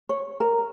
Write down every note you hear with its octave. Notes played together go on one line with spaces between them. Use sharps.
C#5
A#4